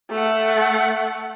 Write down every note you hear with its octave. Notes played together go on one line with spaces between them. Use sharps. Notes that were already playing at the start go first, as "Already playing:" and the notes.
A3 F#5